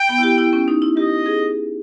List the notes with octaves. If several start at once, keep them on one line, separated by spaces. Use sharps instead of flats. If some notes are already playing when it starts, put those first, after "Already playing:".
Already playing: G5
B3
E4
G4
E4
C#4
D#4
E4
G4 D#5
G#4